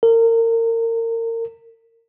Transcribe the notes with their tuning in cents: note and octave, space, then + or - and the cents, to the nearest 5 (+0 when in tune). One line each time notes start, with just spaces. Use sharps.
A#4 -30